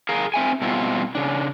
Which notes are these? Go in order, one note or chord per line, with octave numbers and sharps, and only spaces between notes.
G#4 A#4 F5
C4 E5 G#5
B2 G3 C4 E4 F4
C#3 D4